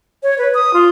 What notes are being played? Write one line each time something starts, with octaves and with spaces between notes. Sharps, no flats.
C#5
B4
D#6
F4